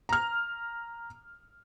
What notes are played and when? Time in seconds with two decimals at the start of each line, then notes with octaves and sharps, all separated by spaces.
0.09 A#5 F6